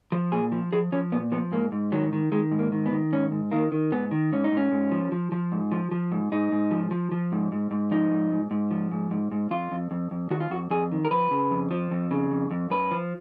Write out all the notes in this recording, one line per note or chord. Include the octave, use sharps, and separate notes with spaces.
F3
A#2 G#4
F3
F3 G#4
F3 C#4
A#2 B3
F3 B3
G#2 A#3
G#2
D#3 F#3
D#3
D#3 G#3
G#2
A#3
D#3
B3
D#3
G#2 C#4
G#2
D#3 A#3
D#3
G#2 B3
D#3
G#2 C#4
D#4
G#2 C#4
G#2
F3
F3
F3
G#2
F3
F3
G#2
G#2 D#4
G#2
F3
F3
F3
G#2
G#2
G#2
F3 D#4
G#2
G#2
G#2
F3
G#2
G#2
G#2
F2 F4
F2
F2
F2
D#3 F#4
F4
F2 F#4
F2 G#4
D#3
A#4
F3 B4
C#3
F2
F3
F2
C#3
F2
F2
F#2 B4
F3